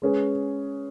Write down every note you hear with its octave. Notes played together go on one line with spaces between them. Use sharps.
G#3 C#4 G#4 B4